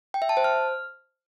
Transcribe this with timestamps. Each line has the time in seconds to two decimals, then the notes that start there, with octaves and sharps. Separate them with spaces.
0.14 G5
0.22 E5
0.29 A5
0.37 C5
0.44 F6